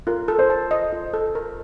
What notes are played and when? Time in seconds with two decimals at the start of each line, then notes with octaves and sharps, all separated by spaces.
0.07 F4 A#4
0.28 A4
0.39 C5
0.50 A5
0.71 D#5
0.93 F4
1.13 A4
1.35 A#4